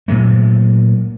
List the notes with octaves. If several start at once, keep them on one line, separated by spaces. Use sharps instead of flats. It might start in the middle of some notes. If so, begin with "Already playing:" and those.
A#2 F#3 G#3 A3